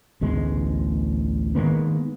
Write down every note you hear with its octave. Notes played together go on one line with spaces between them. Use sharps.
A1 D2 B2 G#3
D#3 G#3 A#3 B3